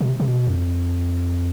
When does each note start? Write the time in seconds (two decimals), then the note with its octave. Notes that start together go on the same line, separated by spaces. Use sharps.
0.01 B2
0.09 C3
0.20 C3
0.28 B2
0.47 F2